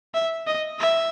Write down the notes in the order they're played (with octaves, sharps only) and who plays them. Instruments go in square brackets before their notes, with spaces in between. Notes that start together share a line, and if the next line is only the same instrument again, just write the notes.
[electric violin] E5
D#5
E5